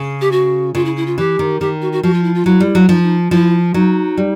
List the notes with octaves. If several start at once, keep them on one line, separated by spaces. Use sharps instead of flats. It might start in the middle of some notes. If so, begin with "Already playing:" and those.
Already playing: C#3
G4
F#4
C#3 F4
E4
E4
F4
E3 G4
D#3
D#3 G4
F#4
F#4
F3 F#4
F4
E4
F4
F#3 E4
G3
F#3
F3 D#4
D#4
F3 E4
F#3 D#4
G3